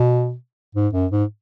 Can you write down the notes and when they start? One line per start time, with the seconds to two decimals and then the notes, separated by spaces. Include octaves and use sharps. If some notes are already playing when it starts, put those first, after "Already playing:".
Already playing: B2
0.75 G#2
0.93 F#2
1.11 G#2